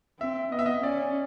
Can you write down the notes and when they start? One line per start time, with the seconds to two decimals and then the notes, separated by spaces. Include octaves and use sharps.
0.20 C4 E5
0.52 B3 D#5
0.59 E5
0.66 D#5
0.82 C#4 D5